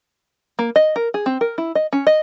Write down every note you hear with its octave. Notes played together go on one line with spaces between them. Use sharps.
A#3
D#5
A#4
G#4
C4
A#4
E4
D#5
C#4
D#5